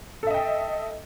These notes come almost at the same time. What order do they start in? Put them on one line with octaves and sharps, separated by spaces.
A4 E5 D#5 G5